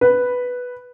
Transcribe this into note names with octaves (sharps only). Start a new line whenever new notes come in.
B4